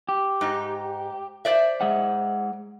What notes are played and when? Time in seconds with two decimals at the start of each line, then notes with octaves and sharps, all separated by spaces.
0.09 G4
0.41 G#2 D#4
1.45 C5 D5 E5
1.81 G#3 G#4 F#5